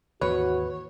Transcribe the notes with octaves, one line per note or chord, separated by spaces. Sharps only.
D#2 G#2 E3 F#4 B4 C#5